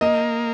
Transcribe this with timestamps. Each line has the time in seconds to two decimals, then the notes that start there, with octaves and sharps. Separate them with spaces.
0.01 A#3 D#5